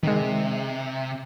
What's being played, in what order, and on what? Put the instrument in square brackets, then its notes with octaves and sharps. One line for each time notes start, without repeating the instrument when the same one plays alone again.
[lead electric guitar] C3 [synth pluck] D#3 G#3